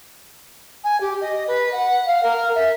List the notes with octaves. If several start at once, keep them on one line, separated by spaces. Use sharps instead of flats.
G#5
G4
D#5
B4
F#5
F5
A#4
E5